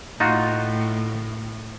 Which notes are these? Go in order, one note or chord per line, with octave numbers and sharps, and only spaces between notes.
A2 D#4 F4 F#4